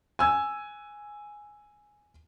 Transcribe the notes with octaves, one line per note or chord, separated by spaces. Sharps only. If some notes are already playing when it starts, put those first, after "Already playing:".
G#5 E6 G#6